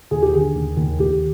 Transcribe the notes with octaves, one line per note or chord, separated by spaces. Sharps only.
D#2 G#4
G4
D3 G#4
D#2
D#2
D#2 G4